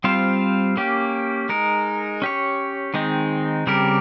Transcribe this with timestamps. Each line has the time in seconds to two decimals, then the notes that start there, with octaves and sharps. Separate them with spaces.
0.04 G3 C4 F4 C5 F5
0.77 A#3 C#4 G4
1.49 G#3 D#4 A#4
2.22 C#4 G4 C#5
2.94 D#3 G#3 C4 D#4
3.67 C#3 G3 C4 G4 A#4